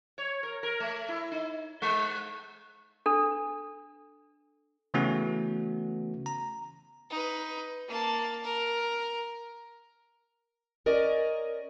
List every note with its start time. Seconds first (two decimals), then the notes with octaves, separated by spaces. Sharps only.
0.18 C#5
0.43 A#4
0.63 A#4
0.80 A3
1.09 E4
1.31 D#4
1.82 G#3
3.06 D4 A4
4.94 C#3 E3 A3 B3 C#4 F#4
6.26 A#5
7.10 D#4 B4
7.88 A#3 A5
8.43 A#4
10.86 C#4 A#4 D5 D#5